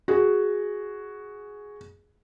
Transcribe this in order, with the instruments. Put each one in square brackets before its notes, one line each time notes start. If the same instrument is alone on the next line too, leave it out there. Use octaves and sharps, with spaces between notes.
[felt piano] F#4 G#4